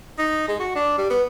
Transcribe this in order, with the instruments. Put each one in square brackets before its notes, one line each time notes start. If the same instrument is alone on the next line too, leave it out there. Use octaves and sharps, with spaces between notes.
[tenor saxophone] D#4
G#3
F#4
D4
G3
B3